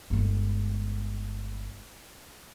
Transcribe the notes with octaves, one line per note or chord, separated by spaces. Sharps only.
G1 G#3